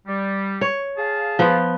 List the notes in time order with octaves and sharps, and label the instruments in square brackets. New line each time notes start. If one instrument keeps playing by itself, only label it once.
[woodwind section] G3
[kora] C#5
[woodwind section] G#4 F5 A5
[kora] F3 B3